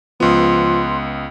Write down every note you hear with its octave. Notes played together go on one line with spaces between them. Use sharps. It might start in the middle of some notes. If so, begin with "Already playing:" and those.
C#2 F3 B3 C6